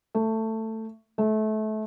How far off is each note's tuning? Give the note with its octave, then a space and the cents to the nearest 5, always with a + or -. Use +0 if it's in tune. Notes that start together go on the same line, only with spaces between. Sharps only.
A3 +15
A3 -25